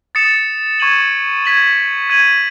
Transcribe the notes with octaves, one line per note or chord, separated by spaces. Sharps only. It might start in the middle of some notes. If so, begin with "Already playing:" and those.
D#6 A6 C#7 E7
C#6 G#6 D#7 F#7
G#6 B6 F#7
G#6 D#7 F#7